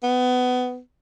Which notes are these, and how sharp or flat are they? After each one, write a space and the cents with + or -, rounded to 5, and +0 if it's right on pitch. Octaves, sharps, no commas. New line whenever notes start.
B3 +20